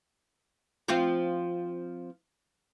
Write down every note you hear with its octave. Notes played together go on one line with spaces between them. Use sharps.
F3 C4 F4